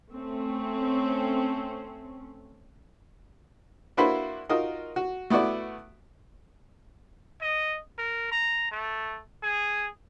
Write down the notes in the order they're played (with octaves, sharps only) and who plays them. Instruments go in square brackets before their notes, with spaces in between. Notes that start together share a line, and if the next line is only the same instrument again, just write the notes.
[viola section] A3 C4 C#4
[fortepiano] A#3 D4 E4 F#4 B4 C5
D#4 F4 F#4 A#4 D#6
F#4
A3 B3 E4 F#4 D5
[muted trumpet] D#5
A#4
A#5
A3
G#4